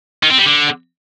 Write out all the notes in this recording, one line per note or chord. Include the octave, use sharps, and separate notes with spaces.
D#3
C4
G3
D3